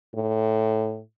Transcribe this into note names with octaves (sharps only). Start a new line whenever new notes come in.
A2